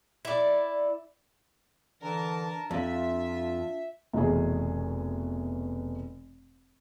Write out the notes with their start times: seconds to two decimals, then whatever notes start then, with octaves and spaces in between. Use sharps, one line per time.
0.25 E4 D5
2.02 D3 E3 D4 A#4 A5
2.71 F2 F4 E5
3.09 D4
4.13 F1 B2 E3 G#4